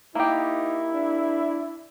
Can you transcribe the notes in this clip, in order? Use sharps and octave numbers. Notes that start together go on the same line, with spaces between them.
A#3 D#4 E4 G4
D4